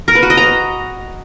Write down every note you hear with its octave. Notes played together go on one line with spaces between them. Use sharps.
A#4
B4
F#4
D#5
A#5